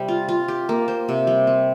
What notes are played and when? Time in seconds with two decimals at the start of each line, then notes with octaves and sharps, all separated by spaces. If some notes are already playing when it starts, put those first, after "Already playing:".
Already playing: C3 G3 C4
0.08 F4
0.28 F4
0.48 G4
0.69 A#3
0.88 C5
1.09 C3
1.27 G3
1.47 C4